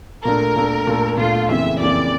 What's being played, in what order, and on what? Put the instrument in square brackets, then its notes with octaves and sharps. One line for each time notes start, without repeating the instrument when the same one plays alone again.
[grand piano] A#2 A3 D4 A4 [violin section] A#4
[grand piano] A#2 A3 D4 A4
A#2 A3 D4 A4
[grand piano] A#2 A3 D4 A4 [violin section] F4
[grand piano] F2 C#3 E3 A#3 [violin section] E5
[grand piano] F2 C#3 E3 A#3 [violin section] D5